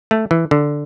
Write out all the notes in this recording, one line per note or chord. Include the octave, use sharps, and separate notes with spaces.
A3
E3
D3